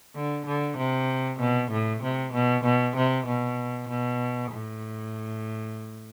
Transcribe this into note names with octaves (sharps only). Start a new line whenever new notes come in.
D3
D3
C3
B2
A2
C3
B2
B2
C3
B2
B2
A2